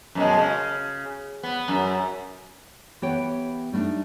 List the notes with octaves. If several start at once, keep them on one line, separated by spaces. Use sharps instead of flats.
F#2 B2 G#3
C#3
B3
F#2
E3 B3 G4 B4 C#5 G5
G3 A3 A#3 D4 D#4